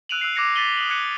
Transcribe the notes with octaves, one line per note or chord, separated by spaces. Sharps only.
E6 F#6 D7 D#7 F7 F#7
E6 F#6 C7
D6 F#6 G#6 A#6 C7 C#7
A6 B6 C7 D#7 F#7 G7
D#6 F#7
D6 F#6 G#6 C#7 D#7